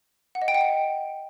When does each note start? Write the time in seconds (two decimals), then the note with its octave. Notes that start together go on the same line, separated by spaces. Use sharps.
0.35 F#5
0.42 D#5
0.48 G5
0.54 F#5
0.61 G5